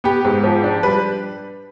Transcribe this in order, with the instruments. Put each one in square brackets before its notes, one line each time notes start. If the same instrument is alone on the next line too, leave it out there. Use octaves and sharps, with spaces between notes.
[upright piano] B3 G4
G#2
F3
D4
G3 B4